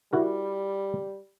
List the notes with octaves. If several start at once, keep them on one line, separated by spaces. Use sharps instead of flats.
G3 E4 F#4 A#4